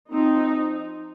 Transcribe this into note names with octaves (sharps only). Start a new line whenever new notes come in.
F3 C4 D#4